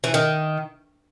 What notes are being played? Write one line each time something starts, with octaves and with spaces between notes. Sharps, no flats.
E3
D#3